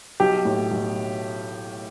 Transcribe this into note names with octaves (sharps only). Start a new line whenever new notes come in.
B1 G4
A2
B1